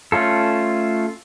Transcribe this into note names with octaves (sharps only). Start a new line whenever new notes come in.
A3 C#4 F4 A4